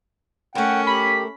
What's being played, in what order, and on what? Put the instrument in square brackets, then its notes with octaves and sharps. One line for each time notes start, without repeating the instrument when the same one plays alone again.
[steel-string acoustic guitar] A3 A#4 [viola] C#4 [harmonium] F#5 G5
[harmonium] G4 [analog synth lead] B5